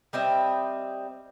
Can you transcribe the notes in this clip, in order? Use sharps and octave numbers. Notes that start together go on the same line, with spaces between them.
G3 C4 D#5 E5